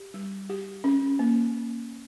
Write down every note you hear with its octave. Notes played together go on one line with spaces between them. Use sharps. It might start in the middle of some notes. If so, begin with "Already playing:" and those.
Already playing: G4
G3
G4
C#4
A#3